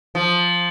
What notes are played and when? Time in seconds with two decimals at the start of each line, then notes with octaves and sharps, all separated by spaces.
0.15 F3